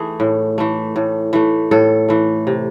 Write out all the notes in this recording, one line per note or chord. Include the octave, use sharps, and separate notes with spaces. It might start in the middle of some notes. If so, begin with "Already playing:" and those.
Already playing: E3 A3 G#4
A2
E3 A3
A2
E3 A3
A2 A4
E3 A3
C3